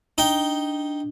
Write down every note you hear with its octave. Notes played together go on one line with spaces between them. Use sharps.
D4 D#4 G5